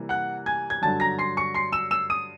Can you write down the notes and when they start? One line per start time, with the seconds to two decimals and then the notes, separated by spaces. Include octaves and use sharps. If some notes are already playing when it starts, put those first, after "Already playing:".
Already playing: C3 E3 G3 A#3
0.09 F#5 F#6
0.46 G#5 G#6
0.70 G#6
0.82 G2 D3 F#3 A5 A6
1.00 A#5 A#6
1.18 C6 C7
1.37 C#6 C#7
1.54 C6 C7
1.72 E6 E7
1.91 E6 E7
2.10 D#6 D#7